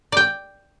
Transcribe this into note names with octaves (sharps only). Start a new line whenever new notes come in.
D5 G5